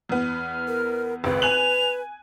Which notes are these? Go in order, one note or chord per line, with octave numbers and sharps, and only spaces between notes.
E2 B3 F6
A#4
G#1 C#2 B4
G#5 F#6 F7 F#7